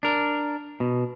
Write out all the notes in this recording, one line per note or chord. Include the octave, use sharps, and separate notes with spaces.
D4 A#4
B2